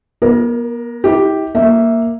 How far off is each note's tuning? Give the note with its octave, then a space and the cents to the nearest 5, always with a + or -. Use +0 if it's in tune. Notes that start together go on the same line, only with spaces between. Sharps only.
B3 -45 A#4 +5
E4 -45 G4 +0
A#3 +0 E5 +0